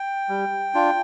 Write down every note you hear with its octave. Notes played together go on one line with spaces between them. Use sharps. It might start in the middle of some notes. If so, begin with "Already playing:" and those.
Already playing: G5
G3
D4 F4